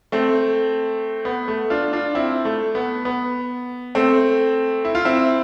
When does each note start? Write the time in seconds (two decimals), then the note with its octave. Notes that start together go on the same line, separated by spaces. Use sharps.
0.12 A3 C4
1.25 B3
1.48 A3
1.70 D4 F4
1.93 D4 F4
2.15 C4 E4
2.45 A3
2.75 B3
3.05 B3
3.95 A3 C4
4.85 E4
4.95 F4
5.05 C4 E4